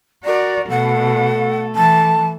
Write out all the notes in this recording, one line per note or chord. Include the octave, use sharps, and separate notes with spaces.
F#4 A#4 D5
B2 A3 A4 F#5
E3 A5